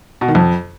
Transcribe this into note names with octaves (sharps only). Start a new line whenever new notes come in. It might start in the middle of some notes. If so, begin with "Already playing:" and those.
B2
D#3
F2